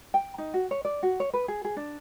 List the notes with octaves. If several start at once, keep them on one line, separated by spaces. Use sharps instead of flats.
G5
D#4
F#4
C#5
D5
F#4
C#5
B4
G#4
G#4
D4